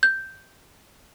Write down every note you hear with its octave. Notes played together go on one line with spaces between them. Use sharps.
G6